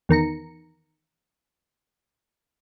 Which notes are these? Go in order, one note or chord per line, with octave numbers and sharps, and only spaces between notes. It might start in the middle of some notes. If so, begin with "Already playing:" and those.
E2 D#3 A#5 C#7